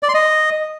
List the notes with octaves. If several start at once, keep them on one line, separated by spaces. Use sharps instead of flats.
D5
C6
D#5